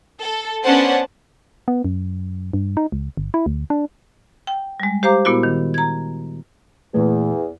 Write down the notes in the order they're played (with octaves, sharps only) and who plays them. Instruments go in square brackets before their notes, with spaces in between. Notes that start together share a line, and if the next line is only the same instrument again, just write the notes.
[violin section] A4
B3 C#4 D4 C5 F#5 A5
[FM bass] B3
F#2
G2
D#4
C#2
G1
E4
D2
D4
[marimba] G5
G3 G#3
G4 C5 F5 A#5 D6
A#2 B3 E4 F#4
D#3
A#5 G#6
[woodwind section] E2 [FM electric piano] A#2 E3 A3